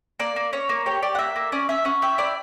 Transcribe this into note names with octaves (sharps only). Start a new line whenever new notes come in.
A#3 D5
A#3
C#4 C#5
A#3
G4 C#5
G4 D5
F#5
A#3 E5
A#3
C#4 D5
C#4 E5
C#4 F#5
G4 E5
E4 D5